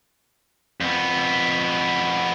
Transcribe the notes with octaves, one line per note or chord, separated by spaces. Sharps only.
F2 B3